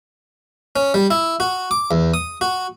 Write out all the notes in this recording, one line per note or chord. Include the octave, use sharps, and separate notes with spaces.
C#4
G3
E4
F#4
D6
E2
D#6
F#4